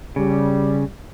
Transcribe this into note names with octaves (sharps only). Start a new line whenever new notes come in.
C#3 G3